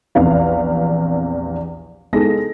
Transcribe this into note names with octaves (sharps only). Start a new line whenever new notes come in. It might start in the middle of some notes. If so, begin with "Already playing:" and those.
A#1 E2 C3 B4 F5
G#3 B3 D#4 G#4 A4 A#6